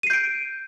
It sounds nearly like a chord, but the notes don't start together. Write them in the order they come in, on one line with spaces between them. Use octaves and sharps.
D#7 C7 G6 D7